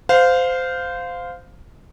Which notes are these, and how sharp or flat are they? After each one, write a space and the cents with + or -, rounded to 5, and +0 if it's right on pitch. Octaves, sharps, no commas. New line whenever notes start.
C5 -20 F5 +10